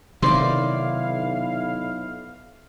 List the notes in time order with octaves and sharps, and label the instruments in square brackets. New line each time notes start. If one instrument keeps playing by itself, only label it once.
[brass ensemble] B1 E4 F5 [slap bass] C3 D#3 [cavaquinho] C5 D5 D6